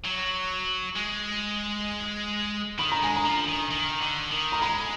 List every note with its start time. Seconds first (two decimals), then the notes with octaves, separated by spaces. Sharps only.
0.04 F#3
0.96 G#3
2.79 D#3 B5
2.92 A#5
3.02 G#3 G#5
3.16 A#5
3.24 F3
3.48 D#3
3.71 D#3
4.01 D3
4.31 D#3
4.52 A#5
4.62 G#3 B5